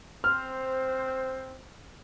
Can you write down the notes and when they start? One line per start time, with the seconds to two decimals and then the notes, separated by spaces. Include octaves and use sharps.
0.24 C4 C5 F6